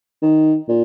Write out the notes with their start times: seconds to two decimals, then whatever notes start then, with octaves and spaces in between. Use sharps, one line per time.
0.22 D#3
0.68 A#2